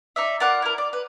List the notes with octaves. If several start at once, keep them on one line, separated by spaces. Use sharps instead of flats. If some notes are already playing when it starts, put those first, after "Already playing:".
D#4 D5 E5
F4 A#4 D5 F#5
E4 A#4
D5
B4